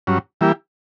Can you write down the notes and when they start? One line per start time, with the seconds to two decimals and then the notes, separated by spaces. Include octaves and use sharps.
0.07 G2 F#3 C#4
0.41 E3 G3 A#3 E4 G4